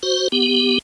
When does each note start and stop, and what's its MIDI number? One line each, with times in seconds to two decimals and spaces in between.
0.03 0.28 66
0.03 0.28 72
0.32 0.78 59
0.32 0.78 67